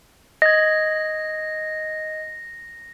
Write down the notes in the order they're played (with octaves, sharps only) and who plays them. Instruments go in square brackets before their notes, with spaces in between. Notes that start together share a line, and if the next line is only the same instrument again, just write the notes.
[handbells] D#5 G#6 [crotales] A#6